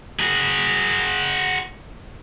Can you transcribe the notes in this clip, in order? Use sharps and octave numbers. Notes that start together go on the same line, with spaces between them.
F#4 G#4